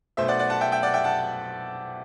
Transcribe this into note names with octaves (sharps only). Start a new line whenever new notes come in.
B1 B2 A3 C5 E5
D5 F#5
D5 F#5
F#5 A5
E5 G5
E5 G5
D5 F#5
E5 G5
F#5 A5